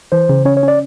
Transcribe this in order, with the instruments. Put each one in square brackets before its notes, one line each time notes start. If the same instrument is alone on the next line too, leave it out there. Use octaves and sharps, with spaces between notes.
[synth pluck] E3 [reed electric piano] C5
[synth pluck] C#3
[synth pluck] C#4 [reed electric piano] C#5
[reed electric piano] C#5
[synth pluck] C#4 [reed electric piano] D5